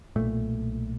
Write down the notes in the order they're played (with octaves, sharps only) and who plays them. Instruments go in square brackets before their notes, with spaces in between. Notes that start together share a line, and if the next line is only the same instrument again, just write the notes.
[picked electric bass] B1 A#2 A3